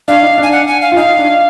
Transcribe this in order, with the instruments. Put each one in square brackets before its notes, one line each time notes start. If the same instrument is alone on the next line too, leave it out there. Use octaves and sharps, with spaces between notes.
[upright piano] D4 [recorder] F5
[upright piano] D#4
[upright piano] D4 [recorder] G#5
[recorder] F#5
G#5
F5
[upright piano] F4
[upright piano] D#4 [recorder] F5
[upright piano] D4